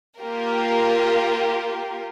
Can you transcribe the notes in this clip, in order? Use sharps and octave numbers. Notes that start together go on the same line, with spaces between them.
A#3 F4 G4 A#4